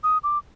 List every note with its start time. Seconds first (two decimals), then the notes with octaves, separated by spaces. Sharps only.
0.04 D#6
0.24 D6